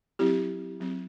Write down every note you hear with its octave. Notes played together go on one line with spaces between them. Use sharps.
F#3 C4 E4 G4
F#3 C4